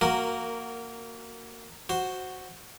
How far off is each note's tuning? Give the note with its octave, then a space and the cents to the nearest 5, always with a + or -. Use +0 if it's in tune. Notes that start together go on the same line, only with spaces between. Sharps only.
A#3 -15 F#4 +0 A#4 +0
F#4 +0 C5 +0